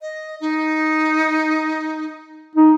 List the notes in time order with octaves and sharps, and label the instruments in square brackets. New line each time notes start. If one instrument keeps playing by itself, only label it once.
[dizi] D#5
D#4
[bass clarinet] D#4